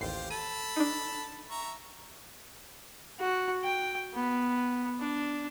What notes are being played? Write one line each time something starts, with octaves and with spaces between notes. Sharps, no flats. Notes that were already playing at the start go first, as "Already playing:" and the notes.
A1 D#2 F4 G4 C5 C7
A4 A5 B5 D#7
D4 D#4
E5 A#5 C#6
F#4
G5
B3
D4